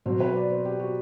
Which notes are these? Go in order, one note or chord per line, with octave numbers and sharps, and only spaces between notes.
B2 F#3 C5
B4
D5
C5
G4
F#4